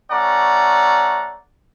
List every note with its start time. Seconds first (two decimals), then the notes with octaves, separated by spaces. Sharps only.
0.11 A3 C#4 D5 F#5 A#5